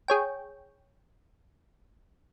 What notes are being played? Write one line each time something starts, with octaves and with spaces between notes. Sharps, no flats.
G#4 C#5 G5